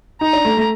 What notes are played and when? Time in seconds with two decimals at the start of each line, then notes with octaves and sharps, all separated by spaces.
0.21 D#4 A#5
0.33 D4
0.45 A3
0.57 A3